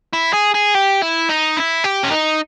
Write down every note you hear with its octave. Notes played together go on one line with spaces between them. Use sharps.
E4
G#4
G#4
G4
E4
D#4
E4
G4
C#4
D#4